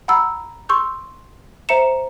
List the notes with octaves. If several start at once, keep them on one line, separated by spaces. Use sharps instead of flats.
F#5 A#5 B5 E6
C6 C#6 E6 G6
C5 E5 A#5 C#7 E7